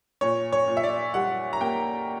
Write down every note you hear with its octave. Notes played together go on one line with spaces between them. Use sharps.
A#2 C#5
C#5
A#2
E5
D5
G3 F#5
A#5
A#3 G5